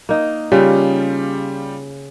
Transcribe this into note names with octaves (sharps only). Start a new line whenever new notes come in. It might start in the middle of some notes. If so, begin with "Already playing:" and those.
A#3 D#4
C#3 G3 F4 G4